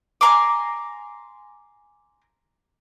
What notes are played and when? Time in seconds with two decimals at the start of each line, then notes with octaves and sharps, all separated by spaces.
0.21 G#5 A#5 C6 D6